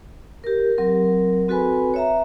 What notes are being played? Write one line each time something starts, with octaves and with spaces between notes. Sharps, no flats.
G4 A#4
F#3 C4 A#4
C4 F#4 A4 B4 G#5 B5
C#5 E5 A#5